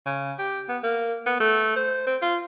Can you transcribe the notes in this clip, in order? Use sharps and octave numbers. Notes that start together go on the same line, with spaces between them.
C#3
G4
B3
A#3
B3
A3
C5
C4
F4